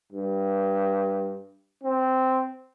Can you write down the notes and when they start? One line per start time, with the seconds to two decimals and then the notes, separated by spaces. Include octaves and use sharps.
0.12 G2
1.83 C4